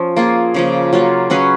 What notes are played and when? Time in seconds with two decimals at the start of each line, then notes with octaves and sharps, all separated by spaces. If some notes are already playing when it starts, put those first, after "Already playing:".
Already playing: F3 C#4
0.16 A#3 F4 G#4
0.54 C#3 F3 A#3
0.93 F#3 A#3 C#4 F4
1.30 F#3 C#4 G#4 B4